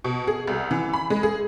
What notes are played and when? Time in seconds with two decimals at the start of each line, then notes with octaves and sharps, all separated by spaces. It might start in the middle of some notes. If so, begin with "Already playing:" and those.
0.04 B2
0.27 G#4
0.47 C2
0.71 E3
0.93 B5
1.10 G#3
1.23 G#4